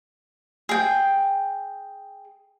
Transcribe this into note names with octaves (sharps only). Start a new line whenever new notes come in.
G#4 G5